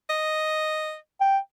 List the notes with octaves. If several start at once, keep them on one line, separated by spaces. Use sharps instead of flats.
D#5
G5